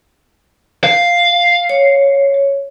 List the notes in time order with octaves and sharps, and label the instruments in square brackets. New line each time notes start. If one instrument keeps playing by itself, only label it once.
[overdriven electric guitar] F5
[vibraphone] C#5